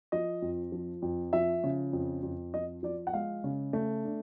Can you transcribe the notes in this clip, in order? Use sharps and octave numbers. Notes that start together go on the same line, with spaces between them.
F3 D#5
F2
F3
F2
F3 E5
C#3
F2
F2
F3 D#5
F3 D5
F#5
G#3 F5
C#3
A3
D4